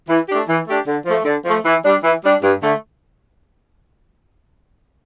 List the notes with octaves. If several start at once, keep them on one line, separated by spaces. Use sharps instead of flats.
E3
A3 D4 G4
E3
A3 D4 G4
D3
F3 A3
D3
F3 A3
E3
G3 D4
E3
G3 D4
G2
D3 A3